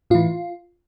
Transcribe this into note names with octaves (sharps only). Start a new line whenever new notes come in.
A2 E3 F4